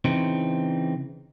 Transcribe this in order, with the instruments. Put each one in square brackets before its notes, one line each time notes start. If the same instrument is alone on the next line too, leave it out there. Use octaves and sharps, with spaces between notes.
[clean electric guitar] C#3 E3 C4 D#4